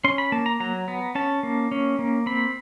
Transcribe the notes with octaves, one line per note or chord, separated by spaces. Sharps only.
C#4 C6
B5
A#3 A5
A#5
F#3 A#5
B3
C#4 A5
A#3
C#4
A#3
C4 B5